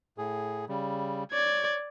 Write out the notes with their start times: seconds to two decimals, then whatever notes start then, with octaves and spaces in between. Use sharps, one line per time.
0.18 A2 G#4
0.69 C#3 G3
1.32 C#5 D5 G#6